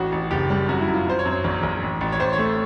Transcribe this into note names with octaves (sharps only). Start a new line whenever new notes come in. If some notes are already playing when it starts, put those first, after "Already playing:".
Already playing: A1 F#4
A1
F#1 G4
G3
F#2 F#4
E4
F#2
F4
F#2 C5
C#5
F#2
C#5
A#1
A#1
A1
A1
C#5
A1 C5
C#5
A3